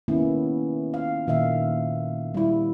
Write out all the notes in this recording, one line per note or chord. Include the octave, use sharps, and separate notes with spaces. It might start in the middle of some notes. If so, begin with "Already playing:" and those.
D#3 A#3 B3 C#4 E4
F5
A#2 D#3 A#3 E5 F5
G3 E4